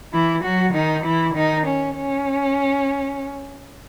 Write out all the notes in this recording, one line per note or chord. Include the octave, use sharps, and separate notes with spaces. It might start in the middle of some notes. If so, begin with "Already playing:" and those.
E3 E4
F#3 F#4
D#3 D#4
E3 E4
D#3 D#4
C#4
C#4